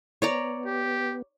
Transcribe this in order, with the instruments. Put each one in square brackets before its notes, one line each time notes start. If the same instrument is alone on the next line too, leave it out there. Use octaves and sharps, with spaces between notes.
[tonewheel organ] B3 [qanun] C#5 D5 A#5
[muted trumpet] G4